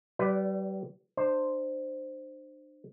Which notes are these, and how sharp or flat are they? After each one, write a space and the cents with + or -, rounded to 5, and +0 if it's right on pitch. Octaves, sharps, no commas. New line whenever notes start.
G3 -35 B4 +0 D5 +0
D4 +35 C5 +0